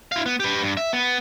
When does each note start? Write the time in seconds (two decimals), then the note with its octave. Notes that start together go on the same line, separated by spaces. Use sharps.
0.12 E4 F5
0.26 B3
0.40 G4 B4
0.63 G2
0.77 E5
0.93 B3